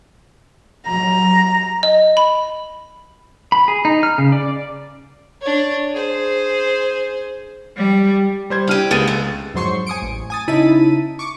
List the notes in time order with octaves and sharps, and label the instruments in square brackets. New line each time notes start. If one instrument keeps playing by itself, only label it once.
[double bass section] F#3 [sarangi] A#5
[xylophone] D#5
B5
[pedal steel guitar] B5
G#4
D#4
F6
C#3
D5
[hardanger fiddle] D4 C#5
G#4 C5
[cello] G3
[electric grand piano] G3 C5 G#6
[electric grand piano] D4 F6 D#7 [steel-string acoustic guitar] E4 G4
[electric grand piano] C#2 A6 D#7 [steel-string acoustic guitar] G#3 A#3 B3
[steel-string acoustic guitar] A3
[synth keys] F2 G#2 F#3 C5 C6 C#6
G#5 D#6 C#7 D7
A1
G#5 D#6 A6
C#3 D#4 E4 A5 B6 D#7
C#6 D6